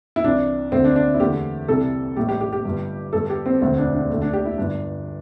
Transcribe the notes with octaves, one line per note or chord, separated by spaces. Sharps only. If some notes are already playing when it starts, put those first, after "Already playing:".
E4
C2 C3 E3 D4
D2 D3 A3 C4
D4
D4
E4
E2 D3 A3 G4
C2 C3 G3 A4
A1 A2 G3 G4
G4
G4
G4
G1 G2 G3
G1 G2 G3 A4
G4
C4
E1 D2 D3 C4
D4
D4
D2 D3 A3
D4
G4
E4
G1 G2 G3 D4